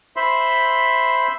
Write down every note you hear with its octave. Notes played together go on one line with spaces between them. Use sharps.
C5 E5 B5 C6